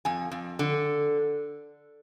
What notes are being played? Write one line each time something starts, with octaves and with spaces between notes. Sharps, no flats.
F2 G#5
F2
D3